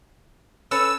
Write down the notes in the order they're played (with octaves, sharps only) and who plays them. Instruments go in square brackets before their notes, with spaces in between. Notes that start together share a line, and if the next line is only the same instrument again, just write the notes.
[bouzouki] C#4 A4 B4 [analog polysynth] E6